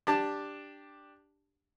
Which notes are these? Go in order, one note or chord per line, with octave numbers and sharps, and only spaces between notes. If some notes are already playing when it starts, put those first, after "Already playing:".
D4 G4 A5